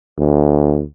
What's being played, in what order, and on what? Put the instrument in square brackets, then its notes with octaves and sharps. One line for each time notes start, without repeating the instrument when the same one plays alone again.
[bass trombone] D2